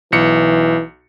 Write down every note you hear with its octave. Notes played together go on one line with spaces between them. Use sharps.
B1 E3 C#7